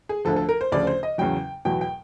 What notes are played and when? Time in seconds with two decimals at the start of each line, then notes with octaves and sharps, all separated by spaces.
0.09 G#4
0.25 D2 D3 F3 A4
0.36 A4
0.49 A#4
0.61 C5
0.72 D2 C#3 F3 D5
0.87 C5
1.03 D#5
1.18 E2 C#3 F#3 G5
1.65 E2 B2 F#3 G5
1.81 G5